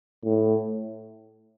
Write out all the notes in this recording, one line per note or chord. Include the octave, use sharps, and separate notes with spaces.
A2